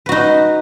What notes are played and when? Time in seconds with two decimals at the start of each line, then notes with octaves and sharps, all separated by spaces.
0.06 B4
0.09 F#4
0.12 D#4